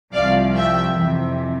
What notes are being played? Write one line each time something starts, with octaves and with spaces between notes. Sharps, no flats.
C2 C3 F3 D5 F5
E5 G5
F2 C3 E3